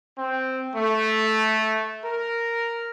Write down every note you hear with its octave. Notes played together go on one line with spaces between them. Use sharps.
C4
A3
A#4